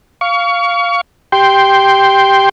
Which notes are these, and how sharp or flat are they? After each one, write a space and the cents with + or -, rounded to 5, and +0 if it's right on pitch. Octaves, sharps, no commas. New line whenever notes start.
F5 +0 C#6 +30
G4 +0 G5 +0 C6 +0